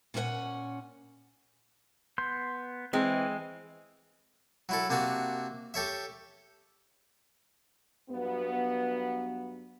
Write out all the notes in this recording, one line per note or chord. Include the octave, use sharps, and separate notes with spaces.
A#2 C#4 E4 B4 F#5 G#5
B3 C6 G6
E3 G#3 C4
F#3 E4 A4
C3 A#3 D4 F#4
G4 A4 C#5 E5
G2 F#3 B3